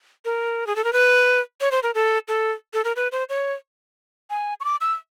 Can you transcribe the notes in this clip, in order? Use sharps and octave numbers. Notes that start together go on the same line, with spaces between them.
A#4
G#4
A4
A#4
B4
C#5
C5
A#4
A4
A4
A4
A#4
B4
C5
C#5
G#5
C#6
D6
E6